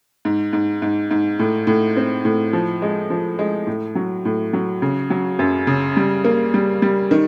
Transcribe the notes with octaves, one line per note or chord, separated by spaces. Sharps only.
G#2
G#2
G#2
G#2
A2
A2
C4
A2
F3
G#3
F3
G#3
A2
F#3
A2
F#3
C#3
F#3
F#2
C#3
G3
A#3
G3
G3
D#3